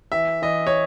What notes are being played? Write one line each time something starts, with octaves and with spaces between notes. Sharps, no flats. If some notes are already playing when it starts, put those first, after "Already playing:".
E3 E5
E3 D#5
C#5